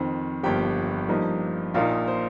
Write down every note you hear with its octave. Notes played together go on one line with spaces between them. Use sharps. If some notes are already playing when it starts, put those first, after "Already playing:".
Already playing: F2 D#3 C4
G1 G2 F3 A#3 G4 G5
G2 F3 A#3 D#4
A#1 A#2 A#3 D#4 F4 F5
C5